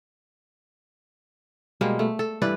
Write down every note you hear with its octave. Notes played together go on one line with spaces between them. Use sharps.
B2 G3 G#3 A#3
A3
A4
G2 E3 B4 D5